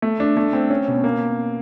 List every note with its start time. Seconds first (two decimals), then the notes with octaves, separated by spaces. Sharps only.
0.02 A3
0.20 D4
0.37 A3
0.53 C4
0.70 C#4
0.88 B2
1.04 A#3